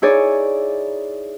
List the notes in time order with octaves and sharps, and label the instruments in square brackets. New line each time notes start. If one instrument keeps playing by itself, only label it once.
[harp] D#4 E4 G#4 C#5 D5